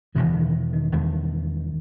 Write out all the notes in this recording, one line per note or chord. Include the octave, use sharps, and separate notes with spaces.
E1 E2 B2 D#3
D#3
D#3
E1 E2 B2 D#3